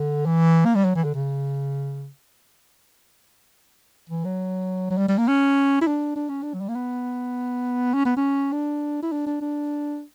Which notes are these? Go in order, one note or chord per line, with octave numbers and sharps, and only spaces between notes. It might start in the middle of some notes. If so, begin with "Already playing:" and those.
Already playing: D3
E3
A#3
G3
F#3
E3
D3
C#3
E3
F#3
F#3
G3
G3
A#3
C#4
E4
D4
D4
C#4
D4
F#3
G3
A#3
B3
C#4
B3
C#4
D4
E4
D4
D4
D4